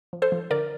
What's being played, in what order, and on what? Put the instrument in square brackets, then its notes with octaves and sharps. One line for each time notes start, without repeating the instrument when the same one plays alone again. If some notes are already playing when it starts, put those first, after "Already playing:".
[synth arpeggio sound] F3
A4 C5
F3
D3 A#4 D5